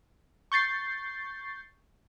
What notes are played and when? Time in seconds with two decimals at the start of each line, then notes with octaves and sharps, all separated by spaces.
0.52 C#6 G6 A6 C7